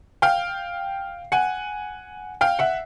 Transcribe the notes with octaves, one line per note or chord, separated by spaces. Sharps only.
F5 G5
F#5 G#5
F5 G5
E5 F#5